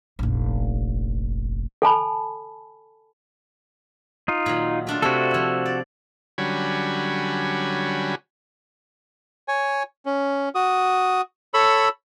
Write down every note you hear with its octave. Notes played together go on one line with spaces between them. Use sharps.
F1 A#1
A4 G#5 A5 B5
D#4 F4
A#2 D#3 F#3
A3 D4 F4
C3 A3 F#4 A4 G#5
F3 E4
D5
D3 F#3 G3 C#4 G#5 B5
C#5 G#5
C#4
F#4 D#6
A4 C#5 B5 E6